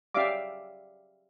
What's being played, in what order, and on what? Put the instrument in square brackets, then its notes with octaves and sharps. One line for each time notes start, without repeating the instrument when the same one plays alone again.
[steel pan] C#4 G4 D5 E5 F5 D6